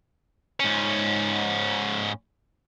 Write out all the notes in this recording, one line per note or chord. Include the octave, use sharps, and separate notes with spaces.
G#2 C#4